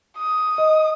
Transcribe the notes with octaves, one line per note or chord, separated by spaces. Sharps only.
D#6
D#5